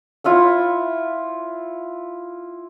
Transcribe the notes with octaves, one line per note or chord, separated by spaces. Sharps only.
E4 F4 E5 F#5